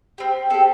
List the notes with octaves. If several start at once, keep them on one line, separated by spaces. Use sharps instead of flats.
C4 G4
C4 G4 A4